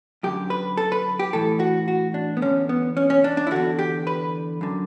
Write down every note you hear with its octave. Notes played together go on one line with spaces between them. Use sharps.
F#2 D3 G4
B4
A4
B4
G4
A2 E3 A4
F#4
F#4
D4
B3
E2 D3 C#4
B3
C#4
C#4
D4
D4
E4
E2 D3 F#4
G4
B4
F#2 D3